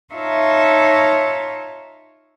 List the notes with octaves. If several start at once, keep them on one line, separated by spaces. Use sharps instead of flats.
D#4 F4 C#5 E5 A5 A#5